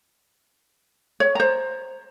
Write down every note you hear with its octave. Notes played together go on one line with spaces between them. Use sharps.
C#5
C5 A#5